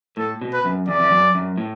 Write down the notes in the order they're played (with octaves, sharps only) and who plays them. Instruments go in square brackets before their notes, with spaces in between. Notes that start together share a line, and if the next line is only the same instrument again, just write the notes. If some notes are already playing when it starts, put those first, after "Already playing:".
[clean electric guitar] A2 [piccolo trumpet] A4
[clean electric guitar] B2
[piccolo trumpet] B4
[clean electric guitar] F#2
[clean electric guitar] E2 [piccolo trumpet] D5
[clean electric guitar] E2
F#2
F#2
A2